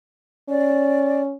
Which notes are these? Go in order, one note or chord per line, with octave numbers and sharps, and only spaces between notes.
C#4 D5